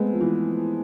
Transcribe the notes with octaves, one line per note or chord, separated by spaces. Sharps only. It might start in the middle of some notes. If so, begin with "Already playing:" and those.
Already playing: G#3 A3 B3 C4
F3
E3